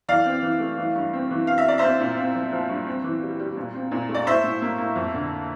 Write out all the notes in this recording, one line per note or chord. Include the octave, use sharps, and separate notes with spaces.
E3 D5 F5
C4
E3
A3
E3
G2
C4
E3
C4 F5
E5
C4 D5
C4 C5 E5
A#2
C4
F3
F3
G2
C4
E3
G3
G3
A#2
C4
A#2
A3
D5
A2 C5 E5
A2
A#3
A#3
F2
D3